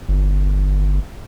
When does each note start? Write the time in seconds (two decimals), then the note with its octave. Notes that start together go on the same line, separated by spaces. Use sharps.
0.08 G1